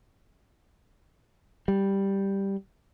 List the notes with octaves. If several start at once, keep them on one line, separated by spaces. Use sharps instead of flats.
G3